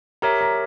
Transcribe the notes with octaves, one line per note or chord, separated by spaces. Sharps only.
G4 A#4 C#5 E5 A#5
A#5